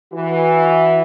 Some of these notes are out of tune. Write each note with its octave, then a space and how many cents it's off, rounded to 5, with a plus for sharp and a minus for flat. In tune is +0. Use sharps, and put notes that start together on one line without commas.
E3 -5 F#4 -5